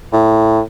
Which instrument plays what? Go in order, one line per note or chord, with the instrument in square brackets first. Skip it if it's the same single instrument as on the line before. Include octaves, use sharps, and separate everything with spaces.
[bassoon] A2